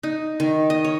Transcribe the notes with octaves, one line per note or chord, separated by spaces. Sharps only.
D#4
D#3
D#5
C#5